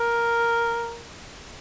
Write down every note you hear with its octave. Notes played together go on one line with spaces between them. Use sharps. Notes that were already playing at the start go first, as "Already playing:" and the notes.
Already playing: A#4